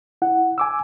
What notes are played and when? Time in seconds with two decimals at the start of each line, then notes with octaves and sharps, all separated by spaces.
0.22 E4 F#5
0.58 G#5 D6 E6